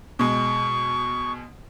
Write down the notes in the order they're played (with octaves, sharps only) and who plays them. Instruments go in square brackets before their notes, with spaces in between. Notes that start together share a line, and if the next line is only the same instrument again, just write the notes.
[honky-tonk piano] B2 G#3 [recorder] C#6